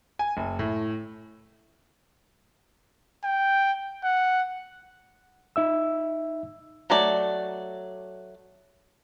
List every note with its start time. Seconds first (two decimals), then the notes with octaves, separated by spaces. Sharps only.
0.19 G#5
0.37 F#1
0.59 A2
3.24 G5
4.04 F#5
5.56 D#4 E5 E6
6.90 F#3 A3 D5